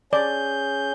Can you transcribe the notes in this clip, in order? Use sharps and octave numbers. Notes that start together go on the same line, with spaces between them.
C#4 G#4 D5 G6